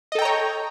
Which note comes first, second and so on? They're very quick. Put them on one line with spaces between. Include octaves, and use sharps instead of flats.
D#5 A4 G5 A#5 C#5